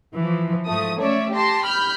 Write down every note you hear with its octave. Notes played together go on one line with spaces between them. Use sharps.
E3 F3
G#2 F3 A3 D#6
A3 C#4 C#5 D5 E5
G4 A5 C6 A#6
B5 F6 G6